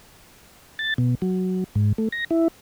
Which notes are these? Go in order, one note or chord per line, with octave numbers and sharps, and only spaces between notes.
A6
B2
F#3
G#2
A3
A#6
E4